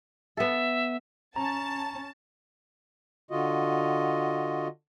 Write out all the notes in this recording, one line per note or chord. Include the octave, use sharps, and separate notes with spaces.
B3 A4 E5
C#4 A5 A#5
D3 F4 F#4 D#5